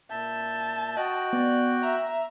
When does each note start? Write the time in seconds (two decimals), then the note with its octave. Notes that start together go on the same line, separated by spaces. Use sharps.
0.10 A#2 E5 A5 G6
0.97 F#4 D#5 G5 F#6
1.33 B3 D5
1.83 E5 A#5